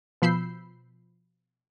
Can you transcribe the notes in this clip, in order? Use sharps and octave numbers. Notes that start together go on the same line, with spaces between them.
B2 F3 B5 E6 G6 C7